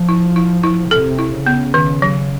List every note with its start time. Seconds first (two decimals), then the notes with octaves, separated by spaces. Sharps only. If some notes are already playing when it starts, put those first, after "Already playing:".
Already playing: F3
0.09 E4
0.36 E4
0.63 E4
0.91 C3 A4
1.19 E4
1.46 C#3 B3
1.74 D#3
2.02 F#3